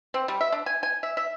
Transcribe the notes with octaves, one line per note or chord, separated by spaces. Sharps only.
C4
G3
E5
D4
G#5
G#5
E5
E5